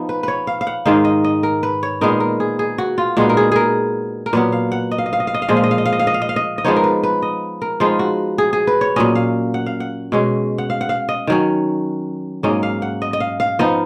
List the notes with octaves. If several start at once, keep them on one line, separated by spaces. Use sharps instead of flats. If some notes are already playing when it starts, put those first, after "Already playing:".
Already playing: F3 B3 D#4
B4
B4 C#5
F5
F5
F#5
G#2 D#3 G#3 D#4 F5
D#5
D#5
A#4
B4
C#5
A#2 G#3 B3 D#4 A#4
A#4
G#4
G#4
F#4
F4
A#2 G#3 B3 D#4 F#4
A#4
G#4
G#4 A#4
A#4
A#2 F#3 B3 B4
F5
F#5
D#5
F5
D#5
F5
D#5
F5
D#5
F5
A#2 F3 G#3 D#5
F5
D#5
F5
D#5
F5
D#5
F5
D#5
F5
D#5
F5
D#5
D#5
F3 G#3 B3 D#4 C#5
A#4
B4
B4
D#5
A#4
F3 G#3 B3 D#4 F4
F#4
G#4
G#4
B4
C#5
A#2 F#3 C#4 D#5
F5
F#5
F5
F#5
B2 G#3 C#4
F#5
F5
F#5
F5
D#5
D#3 F#3 C#4
G#2 F#3 A#3 C#4 D#5
F5
F#5
D#5
D#5
F5
F5
F3 B3 D#4 D#5